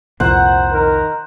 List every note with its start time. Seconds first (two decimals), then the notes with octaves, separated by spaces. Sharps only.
0.20 C2 F2 A#2 C5 F#5 A#5
0.71 D#3 D#4 A#4